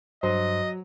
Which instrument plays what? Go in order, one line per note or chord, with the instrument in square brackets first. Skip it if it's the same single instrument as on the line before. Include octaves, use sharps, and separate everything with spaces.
[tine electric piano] G2 [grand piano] F#3 [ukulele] C5 [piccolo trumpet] D#5